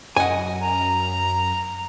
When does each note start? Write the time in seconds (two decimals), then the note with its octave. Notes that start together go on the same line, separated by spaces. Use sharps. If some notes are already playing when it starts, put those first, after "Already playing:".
0.17 F#2 D#5 F#5 G#5
0.60 A#5